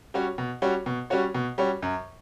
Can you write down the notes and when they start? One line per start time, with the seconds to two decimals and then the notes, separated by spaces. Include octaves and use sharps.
0.14 G3 C#4 F#4 C#5
0.38 B2
0.62 G3 C#4 F#4 C#5
0.86 B2
1.10 G3 C#4 F#4 C#5
1.35 B2
1.58 G3 C#4 F#4 C#5
1.82 F#2